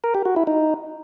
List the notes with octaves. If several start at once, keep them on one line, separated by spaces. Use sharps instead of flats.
A#4
G4
F#4
E4
D#4